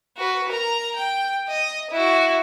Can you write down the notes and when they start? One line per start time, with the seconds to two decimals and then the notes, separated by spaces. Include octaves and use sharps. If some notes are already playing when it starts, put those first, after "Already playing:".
0.17 F#4 B4
0.49 A#4 A#5
0.96 G5
1.48 D#5
1.91 E4 F#4